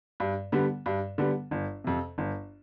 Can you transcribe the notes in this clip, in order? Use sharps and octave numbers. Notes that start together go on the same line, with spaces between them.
G2
D3 G3 B3
G2
D3 G3 B3
G1
F2 C3
G1